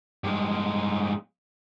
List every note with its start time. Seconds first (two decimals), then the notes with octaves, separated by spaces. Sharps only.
0.24 G2 G#3